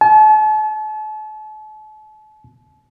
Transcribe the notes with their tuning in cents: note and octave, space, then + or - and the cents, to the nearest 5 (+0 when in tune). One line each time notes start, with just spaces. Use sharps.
A5 -40